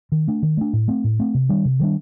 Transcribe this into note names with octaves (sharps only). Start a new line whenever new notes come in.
D#3
A3 D4
D#3
A3 D4
A2
A3 C4
A2
A3 C4
C3
D#3 G3 D4
C3
D#3 G3 D4